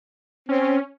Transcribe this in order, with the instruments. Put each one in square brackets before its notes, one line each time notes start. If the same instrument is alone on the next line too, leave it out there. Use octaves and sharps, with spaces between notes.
[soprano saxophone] C4 [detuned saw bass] C#4